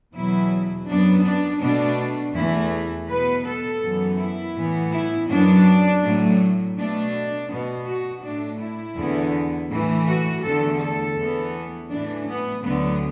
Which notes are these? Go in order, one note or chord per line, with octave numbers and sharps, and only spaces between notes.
E2 B2 F#3 E4
F#2 F#3 B3 D4
D4
B2 A3 D4
E2 E3 A3 E4
B2 B3 B4
A4
F#2 E3 B3
E4
A2 E3 B3
E4
F#2 F#3 B3 D4
A2 F#3 A3
B2 A3 D4
B2 B3
F#4
A2 A3 D4
E4
E2 D3 B3
A2 E3 A3
F#4
E2 D3 A3 A4
A4
E2 E3 B3
A2 E3 A3 D4
B3
D2 D3 F#3 B3